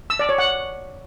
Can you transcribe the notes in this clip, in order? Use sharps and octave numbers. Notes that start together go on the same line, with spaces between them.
E6
D5
C#5
F#5